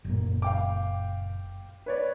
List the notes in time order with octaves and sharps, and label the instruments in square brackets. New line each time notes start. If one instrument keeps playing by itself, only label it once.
[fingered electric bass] F#1 A#2
[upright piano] F5 G5 D6
B4 C#5 D5